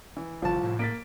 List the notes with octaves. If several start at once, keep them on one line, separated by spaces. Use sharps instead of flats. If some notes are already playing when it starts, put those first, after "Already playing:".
E3
G1 C2 F3 F4 A5
A2
A#3 A6 B6 D7